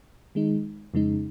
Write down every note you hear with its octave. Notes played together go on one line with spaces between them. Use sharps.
D#3 G#3 D#4
F2 C#3 G#3 D#4